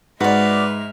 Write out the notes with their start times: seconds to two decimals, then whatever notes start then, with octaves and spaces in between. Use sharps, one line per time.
0.20 G#2 G#3 F#4 B4 D5 E5 F6